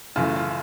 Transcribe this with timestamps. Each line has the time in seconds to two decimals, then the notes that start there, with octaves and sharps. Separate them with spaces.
0.16 F#1 F#2 C#3 E3 A3 F4
0.36 F4